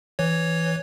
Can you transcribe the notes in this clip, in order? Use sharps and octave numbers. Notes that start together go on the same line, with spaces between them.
E3 C#5